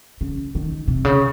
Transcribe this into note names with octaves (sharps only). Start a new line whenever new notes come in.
C#3
D#3
C3
C#3